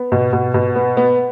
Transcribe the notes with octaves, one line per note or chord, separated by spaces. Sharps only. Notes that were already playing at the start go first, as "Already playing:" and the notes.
Already playing: B3
B2
B2
B2
B3
B3